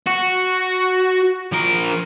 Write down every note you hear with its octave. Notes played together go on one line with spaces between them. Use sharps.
F#4
F3 A#4